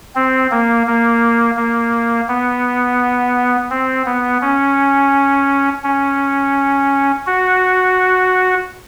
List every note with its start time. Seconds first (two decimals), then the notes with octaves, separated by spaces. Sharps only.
0.15 C4
0.51 A#3
0.87 A#3
1.57 A#3
2.29 B3
3.70 C4
4.06 B3
4.42 C#4
5.84 C#4
7.27 F#4